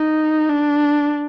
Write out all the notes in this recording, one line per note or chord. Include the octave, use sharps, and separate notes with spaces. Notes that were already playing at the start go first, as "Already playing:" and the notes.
Already playing: D#4
D4